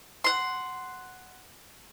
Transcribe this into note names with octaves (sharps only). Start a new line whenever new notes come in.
F#5 C6